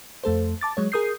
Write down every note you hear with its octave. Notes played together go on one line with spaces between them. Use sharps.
F2 A3 A4 C5
A5 D6 A6
F#3 G#3 C#5
G#4 A#4 D#6 G6 C7